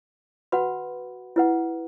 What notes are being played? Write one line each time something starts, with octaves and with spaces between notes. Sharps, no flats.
F#4 B4 F#5 B5
E4 B4 F#5